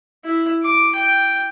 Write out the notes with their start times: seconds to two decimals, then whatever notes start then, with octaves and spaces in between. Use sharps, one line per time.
0.24 E4
0.63 D6
0.96 G5